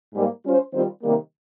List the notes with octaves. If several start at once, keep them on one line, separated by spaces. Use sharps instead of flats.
G#2 G3 A#3
G3 C#4 F4 C5
D#3 G3 C4 F4 C5
C3 D#3 G3 A#3